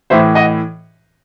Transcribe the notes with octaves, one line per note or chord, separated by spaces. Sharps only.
A2 E3 C5 E5
D#5 F#5